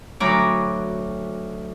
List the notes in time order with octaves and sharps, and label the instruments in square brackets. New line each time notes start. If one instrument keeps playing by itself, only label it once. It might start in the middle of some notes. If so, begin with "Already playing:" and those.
[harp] D2 F#3 C#5 A#5 B5 D6